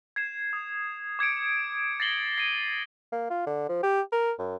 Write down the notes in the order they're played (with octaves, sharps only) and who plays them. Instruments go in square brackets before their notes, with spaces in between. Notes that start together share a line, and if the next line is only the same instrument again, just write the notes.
[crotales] G#6 C7 E7
D#6
D6 G#6 C#7 D7
A6 A#6 C7 F#7 G7
C7 D#7
[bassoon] A#3
F4
D3
F3
G4
A#4
F#2